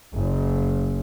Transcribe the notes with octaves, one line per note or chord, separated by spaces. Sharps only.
F#1